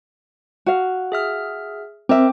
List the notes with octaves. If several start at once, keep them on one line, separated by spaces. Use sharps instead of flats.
F#4 F5
G#4 E5 F6
C4 A#4 E5 G5 D6